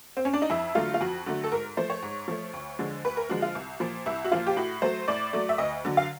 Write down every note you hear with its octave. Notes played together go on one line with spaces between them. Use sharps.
C4
C#4
D4
D#4
F2 E4
D3 F#3 A3 F4
F4
F2 F#4
D3 F#3 A3
A4
G#2 A#4
F3 A3 C5
C#5
G#2
F3 A3
D2
D3 F3 G#3
D2 B4
A#4
D3 F3 G#3 F#4
F4
C2
A#2 F3
C2 E4
F#4
A#2 F3 F4
G4
A2 F#4
F#3 A3 C5
A2 D5
F#3 A3
E5
D2 D#5
D3 F#3
F5